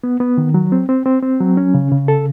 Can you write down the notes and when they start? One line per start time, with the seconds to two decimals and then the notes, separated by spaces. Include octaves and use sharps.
0.04 B3
0.20 B3
0.38 D#3
0.54 F#3
0.72 C4
0.89 C4
1.06 C4
1.22 C4
1.40 F#3
1.57 C#4
1.74 C#3
1.91 C#3
2.08 A4